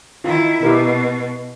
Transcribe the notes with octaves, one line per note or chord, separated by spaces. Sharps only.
D#3 E4 F4
B2 E4 G4 A#4